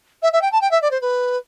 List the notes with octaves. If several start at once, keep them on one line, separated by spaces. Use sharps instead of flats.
E5
E5
G5
A5
G5
E5
D5
C5
B4